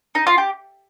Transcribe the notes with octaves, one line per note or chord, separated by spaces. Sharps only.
D#4
F4
G4